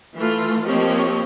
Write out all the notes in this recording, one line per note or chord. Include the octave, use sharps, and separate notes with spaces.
E3 A3 F4
F3 A#3 C4 G4 C#5 D#5